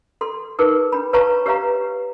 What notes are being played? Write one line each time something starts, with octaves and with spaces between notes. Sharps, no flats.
A4 C6
D#4 G#4 A#4 B4
D4 B5
B4 C#5 F5 A5 A#5 C#6
G4 B4 C#5 E5 F5 A#5